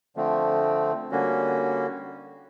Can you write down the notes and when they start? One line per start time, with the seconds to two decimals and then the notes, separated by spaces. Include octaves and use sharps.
0.16 D3 F3 A3 C4
1.11 D3 G3 A#3 C#4 F#4